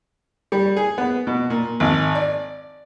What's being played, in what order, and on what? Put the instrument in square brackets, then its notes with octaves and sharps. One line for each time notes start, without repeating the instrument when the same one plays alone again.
[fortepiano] G3
G#4
B3
B2
A#2
G#1
D5